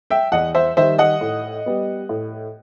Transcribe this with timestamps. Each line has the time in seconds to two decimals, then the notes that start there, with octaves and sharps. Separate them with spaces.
0.10 E5 G5
0.32 E2 D#5 F#5
0.55 C5 E5
0.77 D#3 G3 C5 E5
0.98 D#5 F#5
1.21 A2
1.66 G3 B3
2.09 A2